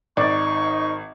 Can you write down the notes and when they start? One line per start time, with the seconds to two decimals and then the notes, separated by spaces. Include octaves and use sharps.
0.17 G#1 D#4 D5 C#6